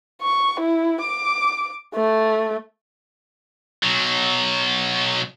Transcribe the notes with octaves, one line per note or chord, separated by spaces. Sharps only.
C#6
E4
D6
A3
B2 F#3